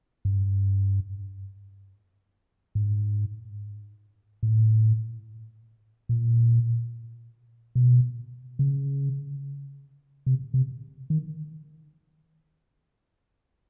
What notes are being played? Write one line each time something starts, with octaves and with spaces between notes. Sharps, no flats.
G2
G#2
A2
A#2
B2
C#3
C3
C3
D#3